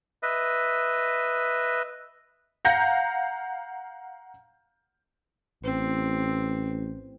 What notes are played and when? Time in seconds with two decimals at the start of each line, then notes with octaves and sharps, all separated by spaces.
0.23 B4 D#5 E5
2.65 F5 F#5 A#5 G6 A#6 C#7
5.64 A1 C4